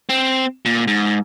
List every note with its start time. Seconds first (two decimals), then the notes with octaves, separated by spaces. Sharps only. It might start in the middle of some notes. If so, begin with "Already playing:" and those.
0.09 C4
0.66 A#2
0.87 G#2